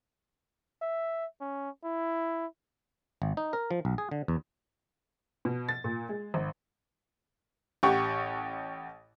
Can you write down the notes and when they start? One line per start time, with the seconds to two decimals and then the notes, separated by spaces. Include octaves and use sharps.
0.82 E5
1.41 C#4
1.84 E4
3.22 G#1
3.37 D#4
3.53 A#4
3.71 F3
3.85 B1
3.98 G#4
4.11 D3
4.28 E2
5.45 B2
5.69 A6
5.84 A#2
6.09 G#3
6.34 G#1
7.83 A1 G4 F#5 C#6